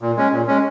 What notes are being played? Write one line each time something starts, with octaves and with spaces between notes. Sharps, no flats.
A#2
G#3 C#4
A#2
G#3 C#4